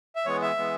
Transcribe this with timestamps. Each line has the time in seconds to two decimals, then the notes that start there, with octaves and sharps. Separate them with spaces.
0.16 E5
0.26 E3 G#3 B3 C#5
0.42 E5
0.57 E3 G#3 B3